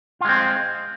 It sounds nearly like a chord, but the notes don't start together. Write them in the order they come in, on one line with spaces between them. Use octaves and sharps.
F4 G#3 C4